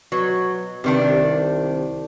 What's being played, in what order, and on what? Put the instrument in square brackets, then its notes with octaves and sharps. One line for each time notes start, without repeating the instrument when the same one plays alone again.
[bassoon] B2 [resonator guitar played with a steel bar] F#3
[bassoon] G2 [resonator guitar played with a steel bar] C3 D#3 D4
[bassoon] C2